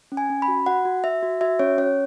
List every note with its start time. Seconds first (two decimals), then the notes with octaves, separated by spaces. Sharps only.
0.12 C#4
0.17 G#5
0.30 C#4
0.42 B5
0.48 F#4
0.66 F#4 F#5
0.85 F#4
1.04 F#4 E5
1.23 F#4
1.41 F#4 E5
1.59 C#4 C#5
1.78 C#4 C#5